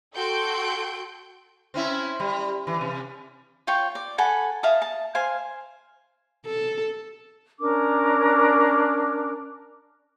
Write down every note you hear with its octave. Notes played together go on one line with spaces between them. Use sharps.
F#4 A4 G5 C6 G6 D7
C4 C#4 E4
G3
E3
C3
F4 C#5 G5 C#6
D5
A4 F#5 G#5 B5
E5 F5 A5 D#6
A5
C5 F5 G#5 C6
A4
C#4 D4 A#4 D6